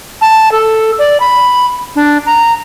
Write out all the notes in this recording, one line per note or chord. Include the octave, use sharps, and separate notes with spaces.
A5
A4
D5
B5
D4
A#5